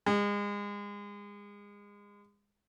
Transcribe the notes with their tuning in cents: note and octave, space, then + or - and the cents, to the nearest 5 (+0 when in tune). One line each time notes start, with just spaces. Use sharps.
G#3 -30